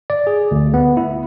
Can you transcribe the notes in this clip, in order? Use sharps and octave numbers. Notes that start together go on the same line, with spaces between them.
D5
G#4
D2
B3
E4